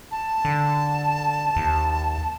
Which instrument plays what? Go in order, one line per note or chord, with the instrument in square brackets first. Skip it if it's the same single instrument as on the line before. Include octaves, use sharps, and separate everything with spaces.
[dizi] A5
[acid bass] D3
D#2